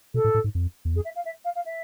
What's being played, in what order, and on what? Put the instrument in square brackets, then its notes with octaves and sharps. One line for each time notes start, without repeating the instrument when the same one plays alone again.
[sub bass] B2 [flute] A4
[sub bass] A2
A2
G#2
F2
E2
[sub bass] F2 [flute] G#4
[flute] E5
F5
E5
F5
F5
E5